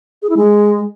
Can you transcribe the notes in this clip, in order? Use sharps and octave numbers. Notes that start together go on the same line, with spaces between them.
G#4
E4
G#3